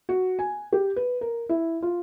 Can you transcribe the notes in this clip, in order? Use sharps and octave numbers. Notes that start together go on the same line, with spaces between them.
F#4
G#5
G4
B4
A#4
E4
F4